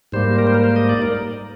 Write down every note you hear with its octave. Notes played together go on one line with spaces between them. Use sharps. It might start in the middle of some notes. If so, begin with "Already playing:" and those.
G#2 G3 A#3 C5
A#4
C5
A#4
C5
D#5
D5
A#4